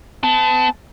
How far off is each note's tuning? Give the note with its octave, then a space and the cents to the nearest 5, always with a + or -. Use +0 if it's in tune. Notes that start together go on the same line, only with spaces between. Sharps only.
B3 +45 A5 -5